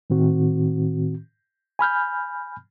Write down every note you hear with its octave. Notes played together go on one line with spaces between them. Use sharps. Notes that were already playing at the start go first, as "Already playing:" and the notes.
A2 D#3 C4 F#4
G#5 B5 F6 G6